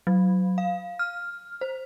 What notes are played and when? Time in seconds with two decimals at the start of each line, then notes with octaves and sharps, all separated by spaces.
0.07 F#3
0.58 F5
0.99 F6
1.61 C5